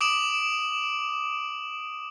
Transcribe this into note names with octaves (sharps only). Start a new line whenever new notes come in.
D6 D#6 D7 E7 F#7